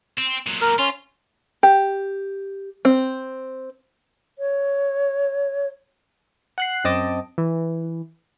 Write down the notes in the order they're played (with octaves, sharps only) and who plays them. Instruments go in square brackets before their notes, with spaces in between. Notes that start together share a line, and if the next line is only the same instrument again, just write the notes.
[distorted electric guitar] C4
A#2 F#3
[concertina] A#4 F6
[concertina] C#4 C6 [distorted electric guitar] F4
[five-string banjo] G4
C4
[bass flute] C#5
[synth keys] F#5 F#6 C7
F#2 C4 D#5 A5 D6
E3